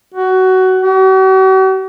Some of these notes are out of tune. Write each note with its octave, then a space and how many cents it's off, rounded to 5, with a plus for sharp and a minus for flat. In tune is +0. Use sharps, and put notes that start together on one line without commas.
F#4 +20
F#4 +45